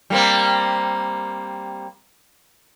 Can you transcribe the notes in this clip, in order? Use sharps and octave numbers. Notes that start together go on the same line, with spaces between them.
G3 A#3 C4